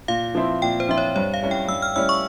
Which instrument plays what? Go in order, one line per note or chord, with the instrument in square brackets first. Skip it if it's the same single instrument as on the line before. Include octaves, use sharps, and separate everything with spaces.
[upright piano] A#2 [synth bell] F5
[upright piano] F3 C4 E4
[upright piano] A#2 [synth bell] G5
[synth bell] C5
[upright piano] F3 C4 E4 [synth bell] E5
[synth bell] C#5
[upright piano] G2 [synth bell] C#5
[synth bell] F5
[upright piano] G3 C#4 E4
[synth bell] G5
[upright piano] G2 [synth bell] E6
[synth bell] F6
[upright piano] G3 C#4 E4 [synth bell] E6
[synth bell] C#6